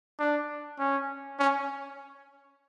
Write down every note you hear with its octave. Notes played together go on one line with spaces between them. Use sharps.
D4
C#4
C#4